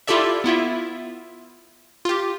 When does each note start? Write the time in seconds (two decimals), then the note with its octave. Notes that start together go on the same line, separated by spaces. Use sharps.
0.07 E4 F4 G4 A4 D5 E5
0.44 B3 E4 F4 E5
2.05 F4 G4